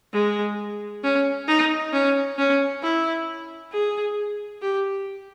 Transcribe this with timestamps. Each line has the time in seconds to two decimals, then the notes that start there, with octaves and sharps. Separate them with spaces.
0.13 G#3
1.03 C#4
1.47 D#4
1.93 C#4
2.38 C#4
2.83 E4
3.73 G#4
4.62 G4